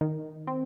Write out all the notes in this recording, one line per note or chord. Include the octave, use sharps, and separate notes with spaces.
D#3
C4